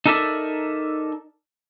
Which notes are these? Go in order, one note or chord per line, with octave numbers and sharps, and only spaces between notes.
D#4 A4 A#4 D5 E5